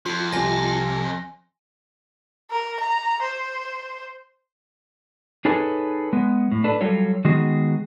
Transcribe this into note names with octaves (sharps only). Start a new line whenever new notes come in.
F2 F4 C6
C2 C3 G#5 A#6
A#4
A#5
C5
D#4 G#4 A4 B4 C#5 G#5
G#3 B3
A2
D4 A4 B4
F#3 G3 F4 A4 C#5
D#3 G#3 B3 F#4 G#4